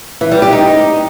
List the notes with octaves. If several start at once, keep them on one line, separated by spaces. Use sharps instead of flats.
E3
G3
G4
D#4